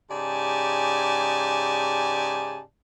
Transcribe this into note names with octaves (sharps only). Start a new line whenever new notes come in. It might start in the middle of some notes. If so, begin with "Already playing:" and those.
G#2 C#3 G4 D5 G#5 A5